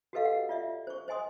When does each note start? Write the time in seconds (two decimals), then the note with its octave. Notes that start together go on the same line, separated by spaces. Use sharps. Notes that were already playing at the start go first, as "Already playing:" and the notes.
0.13 F#4 G4 A4 B4 D#5 F5
0.25 F#5
0.49 F4 D5 E5
0.87 C5 C#6
1.08 C5 D#5 G#5 C6 D#6